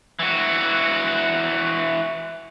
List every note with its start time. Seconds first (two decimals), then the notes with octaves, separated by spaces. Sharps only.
0.19 E3 F#4